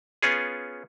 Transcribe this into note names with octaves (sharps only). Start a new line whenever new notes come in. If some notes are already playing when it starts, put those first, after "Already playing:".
B3 C#4 F4 G#4